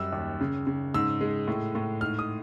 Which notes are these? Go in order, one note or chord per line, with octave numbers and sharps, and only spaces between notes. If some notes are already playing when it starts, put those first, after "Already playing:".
Already playing: F#2 G3 E6
D#2
C#3
C#3
G#2 E6
G#3
A2
A2
G#2 F6
D#6